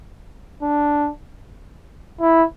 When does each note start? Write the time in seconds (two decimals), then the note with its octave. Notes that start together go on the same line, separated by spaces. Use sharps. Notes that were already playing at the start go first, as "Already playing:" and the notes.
0.62 D4
2.20 E4